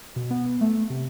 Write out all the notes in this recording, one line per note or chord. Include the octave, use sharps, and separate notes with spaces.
B2
B3
A3
C3